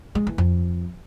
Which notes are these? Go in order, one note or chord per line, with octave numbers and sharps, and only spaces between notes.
G#3
E3
F2